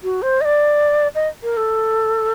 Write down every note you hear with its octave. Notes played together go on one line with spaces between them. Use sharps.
F#4
C5
D#5
D5
D#5
A#4
A4